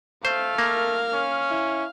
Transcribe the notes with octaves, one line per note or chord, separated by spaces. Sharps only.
A3 C5 F5 F6
A#3 A#4
C#4
E4